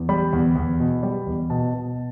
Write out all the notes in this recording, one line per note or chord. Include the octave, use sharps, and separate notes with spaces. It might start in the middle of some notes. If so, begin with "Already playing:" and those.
Already playing: E2
G3 B5
E2
E2
B2
G3
E2
B2 A5
B2